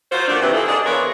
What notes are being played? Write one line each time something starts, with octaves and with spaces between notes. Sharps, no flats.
F4 F#4 C5
F3 A3 A#3 D4
C3 E3
A#3 G#4 A4
D4 G#4 D#5
E3 B3 F4 A#4 B4 C#5